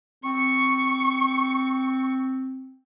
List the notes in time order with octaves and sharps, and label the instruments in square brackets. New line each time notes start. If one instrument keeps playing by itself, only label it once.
[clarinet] C4 [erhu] C#6